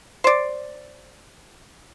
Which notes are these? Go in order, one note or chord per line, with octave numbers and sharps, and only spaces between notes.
C5 D5